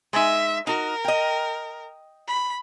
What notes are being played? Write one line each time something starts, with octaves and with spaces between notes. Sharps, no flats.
G#3 D#4 E5
D#4 F#4 A#4
D#5 G5
B5